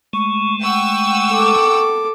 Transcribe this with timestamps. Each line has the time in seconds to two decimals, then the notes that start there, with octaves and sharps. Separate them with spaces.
0.13 G#3 A3 C#6
0.63 F#5 G5 C#6 E6
1.32 A4 D6